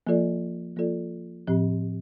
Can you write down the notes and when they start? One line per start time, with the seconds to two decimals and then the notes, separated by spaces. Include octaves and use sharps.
0.07 F3 A#3 F4 A4 D5
0.77 F3 A#3 F4 A4 D5
1.48 A2 F3 C4 G4